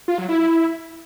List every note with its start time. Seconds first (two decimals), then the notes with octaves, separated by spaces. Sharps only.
0.08 F4
0.18 F#3
0.29 E4